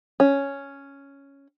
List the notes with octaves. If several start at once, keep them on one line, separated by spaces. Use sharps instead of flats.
C#4